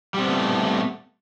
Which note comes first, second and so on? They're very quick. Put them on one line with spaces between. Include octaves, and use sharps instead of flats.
G3 C4 B3 A3